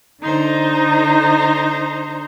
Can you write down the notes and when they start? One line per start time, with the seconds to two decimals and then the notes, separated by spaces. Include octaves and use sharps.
0.21 D3 D#4 C5 A#5